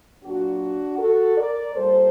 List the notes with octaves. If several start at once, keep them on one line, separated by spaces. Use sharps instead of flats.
A#2 F#3 D4 F#4
F#4 A4
A#4 D5
A#2 G3 A4 C5